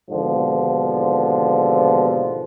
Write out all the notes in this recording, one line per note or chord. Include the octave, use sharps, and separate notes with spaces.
D#2 G#2 B2 D3 F3